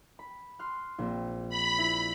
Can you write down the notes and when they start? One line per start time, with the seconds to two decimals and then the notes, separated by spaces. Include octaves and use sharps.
0.19 B5
0.59 C6 F6 F#6
0.99 A#1 C4
1.49 B5
1.78 E4